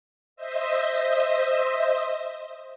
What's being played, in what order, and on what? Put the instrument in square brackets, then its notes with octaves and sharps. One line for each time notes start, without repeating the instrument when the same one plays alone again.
[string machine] C5 D#5 E5